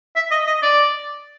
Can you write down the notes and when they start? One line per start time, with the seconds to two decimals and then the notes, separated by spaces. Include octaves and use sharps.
0.16 E5
0.31 D#5
0.47 D#5
0.63 D5